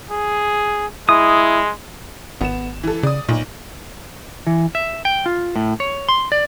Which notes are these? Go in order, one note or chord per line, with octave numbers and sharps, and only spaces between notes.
G#4
G#3 E4 D#6
G#1 B3 E7
E3 A4
C#3 D5 D#6
B1 A#2
E3
E5
G5
F4
A2
C#5
C6
D5